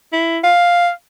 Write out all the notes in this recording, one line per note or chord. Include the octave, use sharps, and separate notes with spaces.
E4
F5